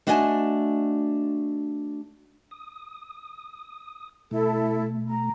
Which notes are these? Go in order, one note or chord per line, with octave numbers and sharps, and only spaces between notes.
A3 D4 F#4 D#5 G5 G#5
D#6
B2 A3 E4 A4
A#5